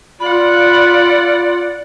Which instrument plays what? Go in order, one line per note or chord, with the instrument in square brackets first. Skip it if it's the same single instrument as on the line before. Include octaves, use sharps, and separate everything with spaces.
[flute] F4 [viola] D5 F#5 [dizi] B5